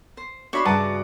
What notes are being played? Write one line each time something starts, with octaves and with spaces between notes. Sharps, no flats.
C5
D4 F#4 C#5 E5 B5 C6
G2 C#3 F#5 A5 A#5 D6 D#6